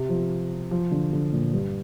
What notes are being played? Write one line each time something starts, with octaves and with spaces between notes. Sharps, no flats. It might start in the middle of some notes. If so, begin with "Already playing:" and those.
Already playing: C3
F3
F3
D3
D3
A#2
G2